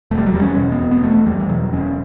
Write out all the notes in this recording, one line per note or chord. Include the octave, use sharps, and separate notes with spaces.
E1 A3
G3
F#3
E2 G3
C#4
B2
B3
E1
B3
E1 A3
E2 G3
E3
B2 F#3
E1 C#4